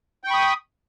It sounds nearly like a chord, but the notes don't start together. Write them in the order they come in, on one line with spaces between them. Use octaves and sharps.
G5 C#6 B5 D#6